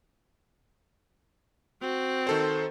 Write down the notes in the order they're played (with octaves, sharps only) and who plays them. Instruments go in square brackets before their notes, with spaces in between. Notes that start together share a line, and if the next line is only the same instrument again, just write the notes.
[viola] C4 F#4
[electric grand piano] D#3 A4 C5